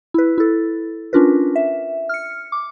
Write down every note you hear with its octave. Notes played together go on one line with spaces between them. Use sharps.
E4 B4
E4 A4
C#4 D4 F4 A#4 B4
E5
F6 C#7
D6